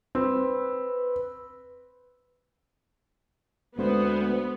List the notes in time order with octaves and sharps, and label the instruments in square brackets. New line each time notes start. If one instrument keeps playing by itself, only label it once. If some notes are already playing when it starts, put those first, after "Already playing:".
[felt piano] C4 [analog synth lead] B4
[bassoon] D2 [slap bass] G#3 A3 C4 [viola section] B3 [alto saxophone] C5